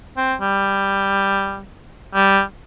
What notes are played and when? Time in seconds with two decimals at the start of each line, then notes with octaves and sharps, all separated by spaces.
0.16 C4
0.41 G3
2.14 G3